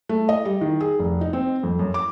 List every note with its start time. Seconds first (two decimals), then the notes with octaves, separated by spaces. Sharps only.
0.09 A3
0.29 D#5
0.45 G3
0.61 D#3
0.81 G#4
0.99 F1
1.21 D#4
1.33 C4
1.63 F2
1.79 F#2
1.94 D6